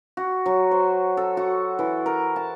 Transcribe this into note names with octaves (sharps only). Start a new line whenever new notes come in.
F#4
F#3
C5
A4
F#4
E3
A#4
A5